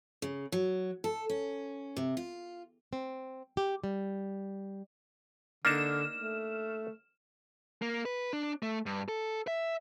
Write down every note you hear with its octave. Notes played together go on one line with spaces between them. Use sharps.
C#3
F#3
A4
C#4
C3
F4
C4
G4
G3
D3 A#3 D4 D#4 F6 E7
A3
A#3
B4
D4
A3
G2
A4
E5